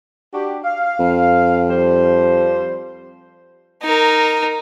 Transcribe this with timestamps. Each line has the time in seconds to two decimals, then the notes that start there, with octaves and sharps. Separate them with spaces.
0.34 D4 F#4 G4
0.64 F5
0.99 F2
1.70 F3 G3 C5
3.82 D#4 A#4